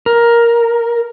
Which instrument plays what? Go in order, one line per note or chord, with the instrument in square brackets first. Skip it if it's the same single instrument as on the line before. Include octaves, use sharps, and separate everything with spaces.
[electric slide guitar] A#4